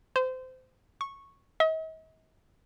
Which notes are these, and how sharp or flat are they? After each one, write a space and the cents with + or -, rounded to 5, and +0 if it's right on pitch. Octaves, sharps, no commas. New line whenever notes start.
C5 -25
C#6 -10
D#5 +45